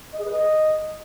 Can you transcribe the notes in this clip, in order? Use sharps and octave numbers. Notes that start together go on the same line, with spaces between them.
D#5
G#4
B4
D#5